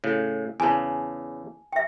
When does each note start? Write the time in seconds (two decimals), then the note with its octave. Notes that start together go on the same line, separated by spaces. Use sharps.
0.04 A2 C#3
0.60 E2 C#3 G#5 A5
1.73 E5 G5